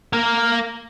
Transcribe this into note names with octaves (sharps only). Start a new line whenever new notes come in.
A#3 A#4